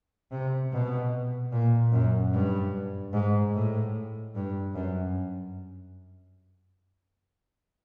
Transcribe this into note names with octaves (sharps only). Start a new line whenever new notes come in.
C3
B2
A#2
F#2
G2
G#2
A2
G2
F#2